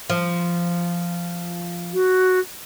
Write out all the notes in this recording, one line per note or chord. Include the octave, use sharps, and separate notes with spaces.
F3
F#4